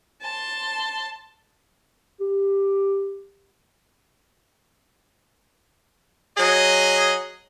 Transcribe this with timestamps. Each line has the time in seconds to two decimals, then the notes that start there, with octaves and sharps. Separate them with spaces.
0.22 A5 C6
2.21 G4
6.36 F#3 G#4 D#5